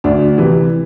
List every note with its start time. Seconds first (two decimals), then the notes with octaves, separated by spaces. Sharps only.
0.04 D2 D4
0.38 C3 E3